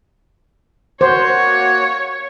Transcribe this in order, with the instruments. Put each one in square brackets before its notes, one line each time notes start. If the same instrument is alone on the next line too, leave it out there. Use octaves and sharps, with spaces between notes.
[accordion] A#3 F#4 [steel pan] C5 [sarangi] C#5